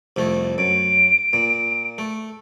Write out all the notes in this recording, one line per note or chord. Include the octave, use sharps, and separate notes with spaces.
C2 F2 A3
F#2 D7
A#2
A3